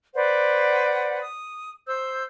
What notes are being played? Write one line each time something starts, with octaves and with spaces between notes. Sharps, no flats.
B4 C5 D5 F#5
D#6
C5 E6 G6